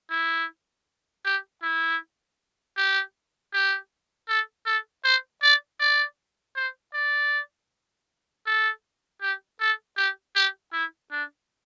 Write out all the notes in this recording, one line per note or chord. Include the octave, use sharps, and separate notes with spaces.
E4
G4
E4
G4
G4
A4
A4
C5
D5
D5
C5
D5
A4
G4
A4
G4
G4
E4
D4